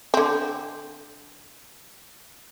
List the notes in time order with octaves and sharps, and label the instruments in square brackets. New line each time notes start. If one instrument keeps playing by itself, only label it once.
[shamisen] D3 C4